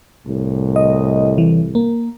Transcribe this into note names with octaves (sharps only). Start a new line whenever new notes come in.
C2 A2
D#5
E3
A#3